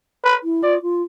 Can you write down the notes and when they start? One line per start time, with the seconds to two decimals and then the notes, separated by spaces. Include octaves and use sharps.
0.24 B4
0.44 E4
0.63 F4 D5
0.82 F4